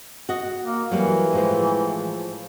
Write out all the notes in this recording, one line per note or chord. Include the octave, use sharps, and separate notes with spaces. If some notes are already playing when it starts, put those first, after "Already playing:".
F#4 D#5
A#3
E3 F#3 G3 A#3
A2 F3 G#3